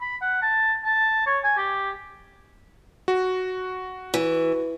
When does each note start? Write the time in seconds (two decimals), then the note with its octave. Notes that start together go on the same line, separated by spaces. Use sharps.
0.01 B5
0.22 F#5
0.42 A5
0.85 A5
1.27 C#5
1.44 G#5
1.58 G4
3.08 F#4
4.14 E3